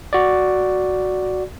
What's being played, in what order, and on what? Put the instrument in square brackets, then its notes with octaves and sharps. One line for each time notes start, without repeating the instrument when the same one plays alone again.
[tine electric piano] F#4 D5